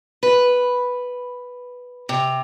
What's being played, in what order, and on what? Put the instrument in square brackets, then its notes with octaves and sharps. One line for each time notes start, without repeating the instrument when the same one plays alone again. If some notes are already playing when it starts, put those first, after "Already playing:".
[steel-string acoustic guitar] B4
C3